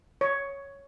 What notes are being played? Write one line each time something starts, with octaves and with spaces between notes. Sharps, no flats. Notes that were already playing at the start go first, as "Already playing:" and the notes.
C#5